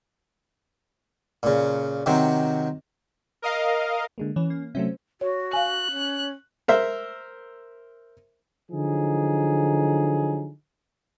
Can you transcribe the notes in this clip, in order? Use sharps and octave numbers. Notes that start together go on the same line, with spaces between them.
A#2 C#3
C3 D#3 F#3 C4
A#4 D#5 F5
D3 G#3 A#3
E3 C#4
A#3
C3 F#3 A3 C#4 C5 E5
F#4 C#5
F5 G#5 F#6
C#4
A#4 C5 E5
D3 F3 F#3 D#4 G#4